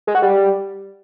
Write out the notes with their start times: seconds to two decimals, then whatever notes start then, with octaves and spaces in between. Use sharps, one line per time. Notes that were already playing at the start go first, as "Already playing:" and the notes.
0.07 G#3
0.15 F#4
0.22 G3